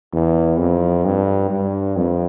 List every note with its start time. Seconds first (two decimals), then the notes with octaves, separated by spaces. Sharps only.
0.13 E2
0.58 F2
1.05 G2
1.51 G2
1.97 F2